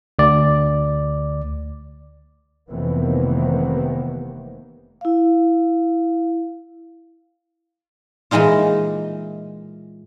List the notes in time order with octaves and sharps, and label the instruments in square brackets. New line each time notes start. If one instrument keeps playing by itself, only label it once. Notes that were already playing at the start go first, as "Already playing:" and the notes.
[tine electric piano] D2 D5
[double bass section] F1 C3 D#3 E3 A#3 B3
[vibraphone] E4 F5
[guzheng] A#2 E3 G#3 D#4 F4